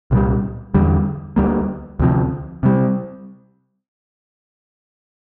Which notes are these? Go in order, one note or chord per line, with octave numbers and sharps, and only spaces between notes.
C2 A#2 G3
E2 D3 G3
D2 D3 G3 A#3
D2 C3 F3
C3 G3